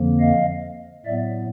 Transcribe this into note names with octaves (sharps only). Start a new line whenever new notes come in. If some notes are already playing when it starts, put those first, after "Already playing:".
Already playing: F2 D3 F3 A#3
D#5 F5
A2 F#3 B3 D5 E5